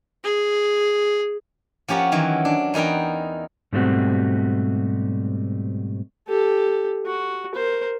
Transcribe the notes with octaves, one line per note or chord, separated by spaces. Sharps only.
G#4
F3 C#4 G4 A#4 F#5
D#3 E3 F#3
D4
E2 D#4 A#4 B4 G5
G#2 B2 G3 A3 C4 F#4
G4 A4
F#4
A#4 C5